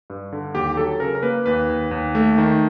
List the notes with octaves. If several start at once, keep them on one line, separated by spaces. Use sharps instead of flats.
G2
D3
D#2 G4
F#3 A4
C#3 A#4
A#4
A#3 B4
D#2 B4
D#2
D#2
A3
D#3